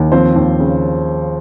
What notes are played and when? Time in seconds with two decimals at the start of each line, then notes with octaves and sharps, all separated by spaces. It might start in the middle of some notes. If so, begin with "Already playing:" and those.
Already playing: D#2
0.12 F3 C4 C5
0.36 D#2
0.59 C#3